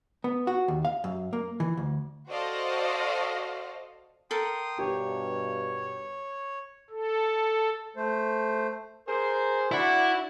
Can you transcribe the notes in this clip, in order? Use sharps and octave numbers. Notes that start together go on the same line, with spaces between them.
B3
F#4
D#2
F5
F#2
A#3
E3
D2
F#4 A4 C5 D5 D#5 F5
A4 A#4 G5 C6 D#6
G2 B2 G4 C#5
A4
A3 C5
G#4 A#4 C5
D4 E4 F#4 D5 F#5